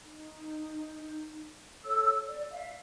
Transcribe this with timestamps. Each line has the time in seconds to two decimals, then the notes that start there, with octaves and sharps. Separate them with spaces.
0.04 D#4
1.85 A4 C#5 E6
2.27 D5
2.51 E5 F5